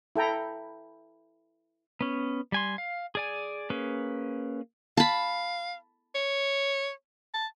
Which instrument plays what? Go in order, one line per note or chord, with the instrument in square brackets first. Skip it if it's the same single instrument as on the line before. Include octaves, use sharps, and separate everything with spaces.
[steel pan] E4 A4 G5 A#5
[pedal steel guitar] B3 C#4
G3 G#5 C6
F5
G#4 D5 G#5
A#3 C#4 G#4 B4
[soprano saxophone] F5 [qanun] A5 B5
[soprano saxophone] C#5
A5